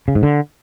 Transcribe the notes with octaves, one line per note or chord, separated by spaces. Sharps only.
C#3
G#2
D3